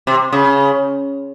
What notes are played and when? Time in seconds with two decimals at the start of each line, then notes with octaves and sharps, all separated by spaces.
0.07 C3
0.33 C#3